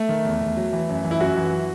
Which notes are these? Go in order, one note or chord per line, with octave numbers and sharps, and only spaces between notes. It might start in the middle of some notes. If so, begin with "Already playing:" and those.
Already playing: A3
D#3
E2
E2
F#3
E3
F#2
E3
E4
F#2 F#4
E3